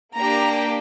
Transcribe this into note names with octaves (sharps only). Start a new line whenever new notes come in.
A#3 D4 G4 A#5